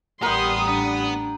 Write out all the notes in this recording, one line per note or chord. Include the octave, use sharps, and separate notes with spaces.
A1 G3 B3 A#4 G5 C6 D#6
B3 D4